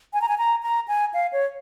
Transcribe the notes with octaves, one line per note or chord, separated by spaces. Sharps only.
G#5
A#5
G#5
A#5
A#5
G#5
F5
C#5